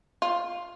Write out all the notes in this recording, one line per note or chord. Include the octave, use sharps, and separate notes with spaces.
F4